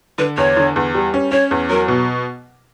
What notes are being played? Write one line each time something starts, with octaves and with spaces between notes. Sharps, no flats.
D3 B4
E2 C#5
D3
E2
G3
C#4
C#4 C#5
E2
F#3 A#4
B2